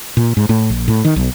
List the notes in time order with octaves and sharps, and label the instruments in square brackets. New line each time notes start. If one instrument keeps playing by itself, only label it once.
[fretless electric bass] A#2
G#2
A2
A#1
A2
D#3
B1